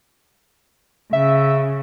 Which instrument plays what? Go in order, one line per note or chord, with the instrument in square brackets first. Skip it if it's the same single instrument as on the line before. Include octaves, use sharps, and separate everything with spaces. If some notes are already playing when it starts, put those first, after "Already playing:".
[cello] C#3 [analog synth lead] E5